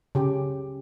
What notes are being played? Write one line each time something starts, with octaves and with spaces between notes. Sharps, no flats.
C#3 G4